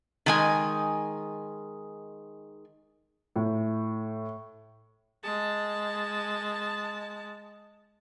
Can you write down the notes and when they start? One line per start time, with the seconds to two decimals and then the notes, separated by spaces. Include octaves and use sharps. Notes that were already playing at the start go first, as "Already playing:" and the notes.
0.26 D#3 G#3 G#5
3.36 A2
5.23 G#3 A5